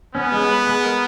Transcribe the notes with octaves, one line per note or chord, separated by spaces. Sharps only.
B3 C#4
G#3
B4
G#3
A#4